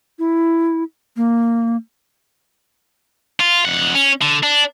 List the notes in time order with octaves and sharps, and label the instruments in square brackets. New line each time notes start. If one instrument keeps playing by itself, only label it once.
[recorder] E4
A#3
[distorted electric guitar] F4
F2 F#5
C#4
D3
D4